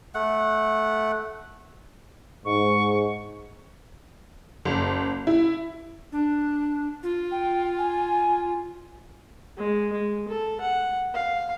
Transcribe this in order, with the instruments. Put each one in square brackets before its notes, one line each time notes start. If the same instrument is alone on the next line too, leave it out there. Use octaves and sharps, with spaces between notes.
[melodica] A3 F#5
[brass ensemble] G#2 [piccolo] C#6
[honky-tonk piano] F#1
E4
[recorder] D4
F4
[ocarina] G5
G#5
[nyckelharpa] G#3
G#3
A4
F#5
F5